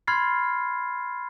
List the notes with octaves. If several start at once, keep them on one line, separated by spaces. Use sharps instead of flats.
B5 C6 F6 G#6 A6 C7